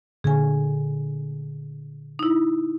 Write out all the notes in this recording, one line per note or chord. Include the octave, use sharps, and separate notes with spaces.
A#2 D3 G#4 G#5
D#4 E4